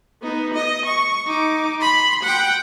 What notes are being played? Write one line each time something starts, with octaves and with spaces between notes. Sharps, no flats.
B3 D#4
D#5
C#6
D#4 D6
B5 C6
F#5 G5